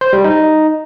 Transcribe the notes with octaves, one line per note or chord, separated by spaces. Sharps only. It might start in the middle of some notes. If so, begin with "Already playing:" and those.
C5
G3
D#4